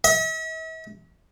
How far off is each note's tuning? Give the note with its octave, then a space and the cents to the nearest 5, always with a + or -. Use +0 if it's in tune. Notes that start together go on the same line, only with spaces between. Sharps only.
E5 -45